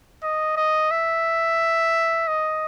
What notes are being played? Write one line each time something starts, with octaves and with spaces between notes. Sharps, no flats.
D#5
D#5
E5
D#5